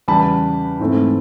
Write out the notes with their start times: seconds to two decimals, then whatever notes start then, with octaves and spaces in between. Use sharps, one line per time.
0.08 E2 C#3 E3 G3 A5 B5
0.80 G#2 E3 A3 C4